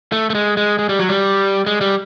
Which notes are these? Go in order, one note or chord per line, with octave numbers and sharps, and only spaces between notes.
A3
A3
G#3
G#3
G#3
G3
F#3
G3
G#3
G3